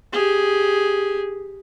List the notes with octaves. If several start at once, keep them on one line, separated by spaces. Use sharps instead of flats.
G4 G#4